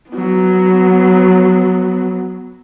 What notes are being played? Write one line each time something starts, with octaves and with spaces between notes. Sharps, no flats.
F#3 B3